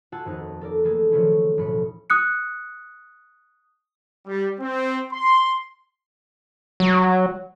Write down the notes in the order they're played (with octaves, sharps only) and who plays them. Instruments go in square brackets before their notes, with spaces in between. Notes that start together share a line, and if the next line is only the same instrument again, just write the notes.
[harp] F4 F#4 F#5 G#5 A5 E6
D#1 F2 D#4 F#5
A4 A#4 D5
E3 A3 A#3 G#4 A4
D#3 F3 F#3 A3 C#4 E4
E1 A2 B5 C#7
[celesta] D#6 F#6 C#7
[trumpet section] G3
C4
C6
[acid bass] F#3